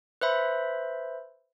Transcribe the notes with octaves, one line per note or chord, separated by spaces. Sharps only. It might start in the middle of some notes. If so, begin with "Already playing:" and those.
B4 C5 E5 B5